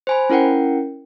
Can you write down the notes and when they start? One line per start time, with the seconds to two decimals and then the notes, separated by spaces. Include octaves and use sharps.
0.07 C5 G#5 B5
0.30 C#4 E4 A#4 F#5 G5